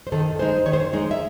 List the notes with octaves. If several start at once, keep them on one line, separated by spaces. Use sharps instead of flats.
C5
D#3 A4
G#3 D#4 C5
D#3 C#5
C5
C#5
G#3 D#4
E5